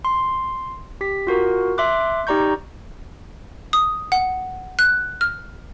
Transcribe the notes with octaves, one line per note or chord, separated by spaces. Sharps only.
C6
G4 B6
F4 F#4 A#4
E5 C6 D6 F#6
D#4 G4 D5 A#5 C#6 G6
D#6
F#5
F#6
F6